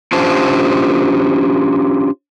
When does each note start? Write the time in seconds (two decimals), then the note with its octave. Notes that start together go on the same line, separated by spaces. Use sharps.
0.13 C#4 D4 F4 G4 C5 A5